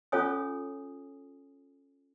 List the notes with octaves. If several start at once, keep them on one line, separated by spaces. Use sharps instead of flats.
C#4 F4 A4 C#5 G#5 D#6